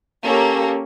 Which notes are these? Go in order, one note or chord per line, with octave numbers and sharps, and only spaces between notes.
A#3 C#4 G4 A4